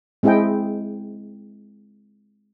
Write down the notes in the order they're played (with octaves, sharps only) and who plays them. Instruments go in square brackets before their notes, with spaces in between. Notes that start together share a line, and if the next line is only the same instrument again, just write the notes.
[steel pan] G#3 C4 E4 G#4 D#5 G5